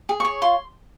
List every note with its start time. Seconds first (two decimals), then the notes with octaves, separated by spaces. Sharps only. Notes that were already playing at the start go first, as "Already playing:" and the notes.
0.09 G#4
0.20 C#5 C#6
0.42 F4 C6